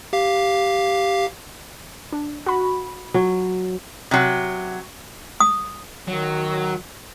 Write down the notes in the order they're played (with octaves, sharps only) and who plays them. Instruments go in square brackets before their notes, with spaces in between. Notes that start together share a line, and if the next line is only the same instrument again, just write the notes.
[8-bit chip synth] G4 F5
[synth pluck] D4
F#4 B5
[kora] F#3
[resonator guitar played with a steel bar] C3 F#3
[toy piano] D#6
[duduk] D#3 [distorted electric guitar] F#3